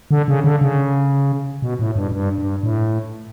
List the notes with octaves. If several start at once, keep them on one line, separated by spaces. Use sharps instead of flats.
D3
C#3
D3
C#3
B2
A2
G2
G2
G2
A2